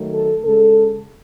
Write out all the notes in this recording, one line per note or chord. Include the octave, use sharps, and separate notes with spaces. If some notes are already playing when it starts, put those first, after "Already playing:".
Already playing: D#3 F#3 A3
A4
C#3 G#3 A4